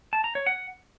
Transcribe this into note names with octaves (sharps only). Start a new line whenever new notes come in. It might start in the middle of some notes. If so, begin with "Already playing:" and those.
A5
A#5
C#5
F#5